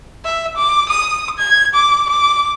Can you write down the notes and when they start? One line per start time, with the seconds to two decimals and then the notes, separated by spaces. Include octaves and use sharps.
0.24 E5
0.57 D6
0.89 D#6
1.38 G#6
1.74 D6
2.09 D6